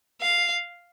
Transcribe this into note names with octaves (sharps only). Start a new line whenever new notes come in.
F5